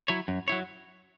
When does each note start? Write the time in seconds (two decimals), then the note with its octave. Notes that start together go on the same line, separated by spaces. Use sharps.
0.08 F#3 E4 C#5
0.28 F#2
0.48 F#3 E4 C#5